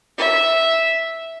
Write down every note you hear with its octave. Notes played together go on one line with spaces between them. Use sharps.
E5